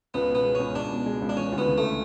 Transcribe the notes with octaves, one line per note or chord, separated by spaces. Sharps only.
C#2 B3
B2
B3
G#3
C#2 C#4
C#2 D4
B2
G#3
C#2
D4
E3 C#4
D2
B3
C#3
A3